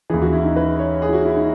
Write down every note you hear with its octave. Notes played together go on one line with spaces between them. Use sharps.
D#2 C#3 E3 G#4
F#4
E4
D#4
B4
C#5
G#4
E4
F#4
E4
D#4